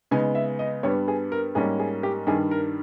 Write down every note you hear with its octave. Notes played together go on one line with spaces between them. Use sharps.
C#3 G#3 B3 D#4 G#5
E5
D#5
G2 G3 B3 C#5
G#4
A#4
G#2 G3 A#3 C#4 G#4
G#4
G4
G2 D#3 G3 G#4
A#4